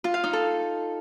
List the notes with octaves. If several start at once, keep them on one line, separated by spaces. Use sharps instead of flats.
F4
F5
D#4
A4